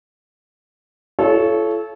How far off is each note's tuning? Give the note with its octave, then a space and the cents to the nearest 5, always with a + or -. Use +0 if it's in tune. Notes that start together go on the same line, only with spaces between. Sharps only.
F4 -45 A4 -25 C#5 +0